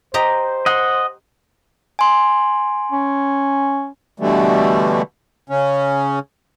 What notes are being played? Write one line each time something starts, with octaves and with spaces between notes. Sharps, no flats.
G4 C5 D#5 A#5
D#5 F#5 C6
G#5 C6
C#4
B2 D3 E3 G3 A3
C#3 C#4